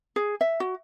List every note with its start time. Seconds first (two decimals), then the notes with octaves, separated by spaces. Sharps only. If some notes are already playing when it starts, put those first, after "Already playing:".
0.16 G#4
0.41 E5
0.60 F#4